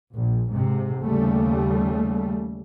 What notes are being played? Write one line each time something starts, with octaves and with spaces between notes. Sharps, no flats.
A#1
G#2 C3
D#2 C#3 G3 A3